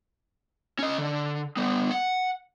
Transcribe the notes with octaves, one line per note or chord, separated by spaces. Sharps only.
C#4 D#5
D3
G3 B3
F#5